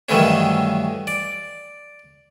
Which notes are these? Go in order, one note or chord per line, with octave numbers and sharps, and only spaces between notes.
G2 D#3 E3 F#3 A3 C#4
D5